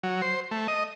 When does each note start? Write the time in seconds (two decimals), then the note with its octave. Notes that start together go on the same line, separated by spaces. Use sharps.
0.03 F#3
0.22 C5
0.51 A3
0.68 D#5